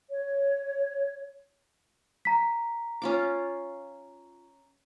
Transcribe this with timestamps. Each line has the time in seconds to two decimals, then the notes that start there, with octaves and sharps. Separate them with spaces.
0.10 C#5
2.25 A#5 B6
3.02 C#4 F4 D6